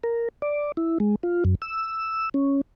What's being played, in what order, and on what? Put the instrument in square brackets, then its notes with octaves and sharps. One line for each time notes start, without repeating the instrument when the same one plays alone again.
[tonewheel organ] A#4
D5
E4
G#3
F4
F#2
E6
C#4